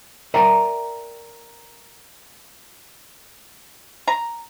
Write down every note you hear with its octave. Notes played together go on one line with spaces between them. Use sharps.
A#4 D5 E5 G5 A#5
A#5